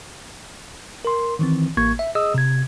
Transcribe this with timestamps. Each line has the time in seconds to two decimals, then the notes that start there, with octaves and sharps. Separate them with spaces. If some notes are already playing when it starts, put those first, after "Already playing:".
1.05 A#4 C6
1.39 D#3 E3 C4
1.77 A1 A#3 C#6 G#6
1.99 E5
2.15 G#4 D#5 D#6 E6
2.34 C3 G#6